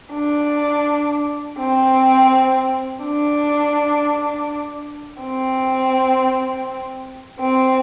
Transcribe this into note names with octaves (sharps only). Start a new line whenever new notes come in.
D4
C4
D4
C4
C4